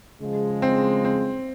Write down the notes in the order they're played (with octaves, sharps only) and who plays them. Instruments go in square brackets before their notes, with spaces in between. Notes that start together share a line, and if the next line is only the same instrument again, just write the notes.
[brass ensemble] C#3 F3 G#3
[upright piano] C4
C4